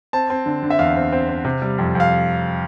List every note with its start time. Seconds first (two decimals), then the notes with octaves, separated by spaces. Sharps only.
0.13 C4 A5
0.30 C4
0.46 D3
0.63 D3
0.70 E5
0.79 E2 F5
0.96 C4
1.12 C4
1.29 C4
1.45 C3
1.62 G3
1.78 F2
1.95 F2
2.00 F5